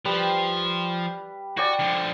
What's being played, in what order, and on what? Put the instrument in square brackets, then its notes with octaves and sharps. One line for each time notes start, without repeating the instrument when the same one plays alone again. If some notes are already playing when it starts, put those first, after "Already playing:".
[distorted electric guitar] F3 [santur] G3 B4
[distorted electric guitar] F#4 [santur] D5 G5 G#5
[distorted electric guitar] D3 F3